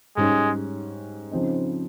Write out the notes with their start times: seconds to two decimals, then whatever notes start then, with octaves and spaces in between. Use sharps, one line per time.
0.16 G#2 G3 G#3 C#4
1.31 C#3 F3 C4 D#4